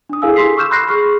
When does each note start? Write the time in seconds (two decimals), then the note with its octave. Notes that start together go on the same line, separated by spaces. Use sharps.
0.09 D4 D#6
0.22 E4 G#4 A4 F5 G#5 E6
0.36 G4 A4 C6 B6 C7
0.57 C#6 D6 E6 F6 G6 E7
0.71 B5 C6 F#6 G6 A#6 C7
0.89 G#4 C#6 F6 C7